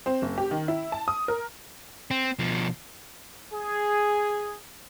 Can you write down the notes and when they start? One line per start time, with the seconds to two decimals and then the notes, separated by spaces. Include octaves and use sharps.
0.06 C4
0.22 F#1
0.38 G4
0.51 D#3
0.68 E4
0.92 A5
1.08 D#6
1.28 A#4
2.11 C4
2.39 B2 F3
3.54 G#4